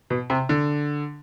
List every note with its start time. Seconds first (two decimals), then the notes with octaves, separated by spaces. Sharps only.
0.10 B2
0.30 C3
0.49 D3